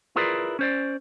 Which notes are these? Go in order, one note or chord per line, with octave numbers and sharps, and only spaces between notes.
E4 F4 G#4 A#4 B4 D5
C#4 C5 D5